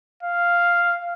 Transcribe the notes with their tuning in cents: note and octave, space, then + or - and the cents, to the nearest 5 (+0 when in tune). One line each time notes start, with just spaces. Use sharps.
F5 -5